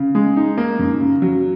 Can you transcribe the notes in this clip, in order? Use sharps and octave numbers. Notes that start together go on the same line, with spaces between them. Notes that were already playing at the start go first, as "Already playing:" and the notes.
Already playing: C#3
G#3
D#4
A#3
F#2
C#3
F#3